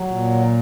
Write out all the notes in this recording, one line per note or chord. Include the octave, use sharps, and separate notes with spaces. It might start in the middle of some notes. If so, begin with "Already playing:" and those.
Already playing: F#3
A#2